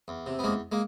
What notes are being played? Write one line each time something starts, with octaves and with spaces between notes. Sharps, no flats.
E2
C3
B3
E2 G#3 A#3
G#3 A#3